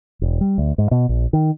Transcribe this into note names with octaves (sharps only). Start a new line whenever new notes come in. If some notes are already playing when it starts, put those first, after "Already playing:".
E1
G3
D2
G#2
B2
A#1
D#3